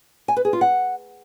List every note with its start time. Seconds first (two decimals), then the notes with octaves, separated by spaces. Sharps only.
0.28 G#5
0.36 B4
0.45 G#4
0.53 F4
0.61 F#5